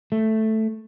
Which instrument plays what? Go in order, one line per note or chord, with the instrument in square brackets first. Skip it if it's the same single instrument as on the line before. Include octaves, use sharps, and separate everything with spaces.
[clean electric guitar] A3